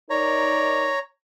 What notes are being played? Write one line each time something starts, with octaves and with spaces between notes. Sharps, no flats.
D#4 A#4 C#5 D5 A#5